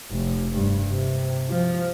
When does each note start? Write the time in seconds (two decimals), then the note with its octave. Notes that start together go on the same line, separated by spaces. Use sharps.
0.11 F1
0.53 G2
0.90 C3
1.50 F3